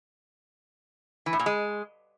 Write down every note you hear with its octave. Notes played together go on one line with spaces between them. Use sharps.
E3
A2
A#2
G#3